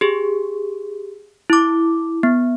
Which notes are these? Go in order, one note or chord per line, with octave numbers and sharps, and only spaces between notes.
G4 G#4
E4 D6
B3